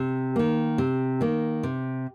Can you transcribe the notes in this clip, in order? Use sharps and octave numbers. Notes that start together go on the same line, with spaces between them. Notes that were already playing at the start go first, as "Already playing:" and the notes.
Already playing: C3
D#3 A#3
C3
D#3 A#3
C3